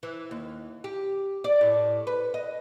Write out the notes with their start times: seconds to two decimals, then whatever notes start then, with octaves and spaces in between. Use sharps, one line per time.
0.03 E3
0.31 D#2
0.84 G4
1.44 D5
1.61 A2
2.07 B4
2.34 D#5